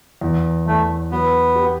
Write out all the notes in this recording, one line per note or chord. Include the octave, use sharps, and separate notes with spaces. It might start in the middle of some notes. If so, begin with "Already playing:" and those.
E2
E2 A3
F#3 B3
G4